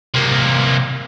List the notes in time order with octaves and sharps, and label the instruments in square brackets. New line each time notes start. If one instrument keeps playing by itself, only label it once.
[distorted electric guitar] C3 A#3